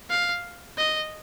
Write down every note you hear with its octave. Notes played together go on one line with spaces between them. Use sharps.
F5
D#5